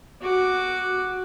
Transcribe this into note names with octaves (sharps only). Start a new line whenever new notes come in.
F#4 D6